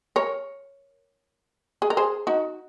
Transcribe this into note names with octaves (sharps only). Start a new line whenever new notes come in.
A#4 C#5
G#4
A#4
G#4 C5
D#4 F#4